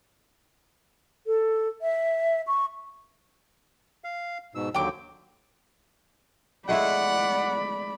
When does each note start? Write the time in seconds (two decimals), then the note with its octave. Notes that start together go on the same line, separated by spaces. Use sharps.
1.27 A4
1.82 E5
2.47 C#6
4.04 F5
4.55 G#2 B2 E6
4.74 D#2 D3 F#3 G5 D6
6.69 G#3 A3 E4 D5 F#5 B5